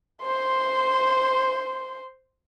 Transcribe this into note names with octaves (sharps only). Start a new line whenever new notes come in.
C5 C6